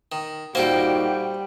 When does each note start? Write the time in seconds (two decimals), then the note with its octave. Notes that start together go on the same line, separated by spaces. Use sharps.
0.12 D#3
0.55 A#2 G3 A#3 D#4 F#4 A4 C5 G5